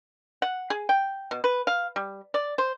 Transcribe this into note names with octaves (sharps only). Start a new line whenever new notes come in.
F#5
G#4
G5
B2
B4
F5
G3
D5
C5